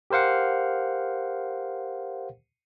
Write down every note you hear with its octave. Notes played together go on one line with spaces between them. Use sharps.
G4 A#4 C5 F5 F#5